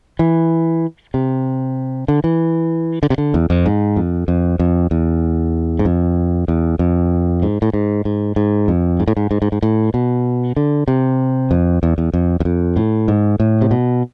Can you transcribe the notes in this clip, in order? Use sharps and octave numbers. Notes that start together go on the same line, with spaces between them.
E3
C3
D3
E3
D3
C3
D3
E2
F2
G#2
F2
F2
F2
E2
G#2
F2
E2
F2
G#2
A2
G#2
G#2
G#2
F2
G#2
A2
G#2
G#2
G#2
G#2
A2
B2
D3
C3
F2
E2
E2
F2
E2
F2
A2
G#2
A2
C3
B2